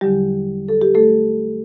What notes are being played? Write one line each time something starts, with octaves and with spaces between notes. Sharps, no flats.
E2 D3 F#3 G3 G4
A4
G4
A3 A4